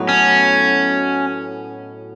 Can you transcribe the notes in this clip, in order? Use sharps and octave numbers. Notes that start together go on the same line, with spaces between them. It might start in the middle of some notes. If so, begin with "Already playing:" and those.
Already playing: A2 F#3 B3 D#4
C#4